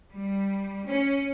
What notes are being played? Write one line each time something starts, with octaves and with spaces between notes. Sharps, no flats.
G3
C#4